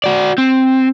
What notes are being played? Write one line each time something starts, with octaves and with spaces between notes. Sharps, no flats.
F#4 D5
C4